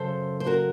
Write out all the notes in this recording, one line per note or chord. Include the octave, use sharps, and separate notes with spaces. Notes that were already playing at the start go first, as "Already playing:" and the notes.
Already playing: F#2 C#3 A4 C5
C5
F#4 A#4